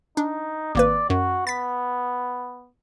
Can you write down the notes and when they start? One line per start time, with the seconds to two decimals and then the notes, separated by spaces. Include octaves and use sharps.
0.17 D4 D#4
0.75 G#1 A#3 B4 D5
1.10 F#2 F#4
1.47 B3 A6 B6